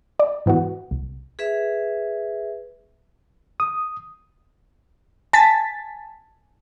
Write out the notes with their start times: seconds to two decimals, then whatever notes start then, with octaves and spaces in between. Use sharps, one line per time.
0.20 D5
0.46 G#2 E3 B3 F#4
0.91 C2
1.39 G#4 B4 E5
3.60 D#6
5.33 G#5 A5 A6 B6